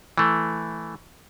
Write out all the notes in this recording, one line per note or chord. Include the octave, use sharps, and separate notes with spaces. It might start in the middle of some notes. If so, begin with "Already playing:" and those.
E3 A3